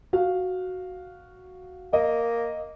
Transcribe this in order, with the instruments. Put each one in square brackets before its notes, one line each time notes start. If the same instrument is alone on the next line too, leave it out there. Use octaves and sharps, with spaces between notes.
[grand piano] F#4 F5
[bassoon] A#3 [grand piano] D#5